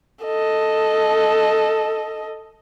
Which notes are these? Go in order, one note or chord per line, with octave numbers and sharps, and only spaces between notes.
A4 D#5